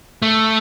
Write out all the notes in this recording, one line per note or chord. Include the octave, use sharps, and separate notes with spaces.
A3